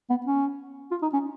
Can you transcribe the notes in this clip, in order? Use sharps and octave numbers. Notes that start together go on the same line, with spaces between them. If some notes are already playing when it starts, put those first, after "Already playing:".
B3
C#4
F4
D#4
C#4